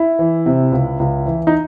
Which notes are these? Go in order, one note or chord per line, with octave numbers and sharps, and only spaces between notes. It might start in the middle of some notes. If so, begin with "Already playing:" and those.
Already playing: E4
E3
C3
C#2
C#2
E3
D#4